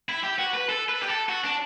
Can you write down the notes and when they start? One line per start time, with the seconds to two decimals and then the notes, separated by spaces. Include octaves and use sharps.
0.09 E4
0.24 G4
0.39 F#4
0.54 B4
0.69 A4
0.89 B4
1.02 G4
1.09 A4
1.29 F#4
1.44 D4